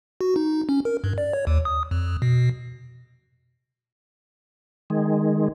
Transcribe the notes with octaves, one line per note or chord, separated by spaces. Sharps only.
F#4
D#4
C#4
A#4
G2
D5
C#5
D#2
D#6
F2
B2
D#3 G#3